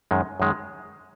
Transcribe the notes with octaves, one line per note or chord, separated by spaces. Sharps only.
F#2 D#3 G#3
F#2 D#3 G#3